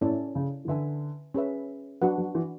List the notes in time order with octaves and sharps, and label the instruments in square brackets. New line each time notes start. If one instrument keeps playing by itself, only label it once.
[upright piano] A2 [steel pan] C#4 E4 A4 D5
[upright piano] C#3
E3
[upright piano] D3 [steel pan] B4 E5 G#5
[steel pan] C#4 G#4 B4 E5
[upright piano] F#3 [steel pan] D4 F#4 B4 F#5
[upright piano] F#3
E3